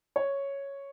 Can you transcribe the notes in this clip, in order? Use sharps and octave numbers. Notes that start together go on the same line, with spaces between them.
C#5